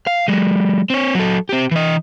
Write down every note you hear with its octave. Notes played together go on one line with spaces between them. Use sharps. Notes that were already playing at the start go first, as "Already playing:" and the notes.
F5
F#3 G#3
C4 C#5
F#3 A4
C4 G4
E3 D#5